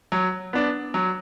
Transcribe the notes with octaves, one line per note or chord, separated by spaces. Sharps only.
F#3
B3 D4
F#3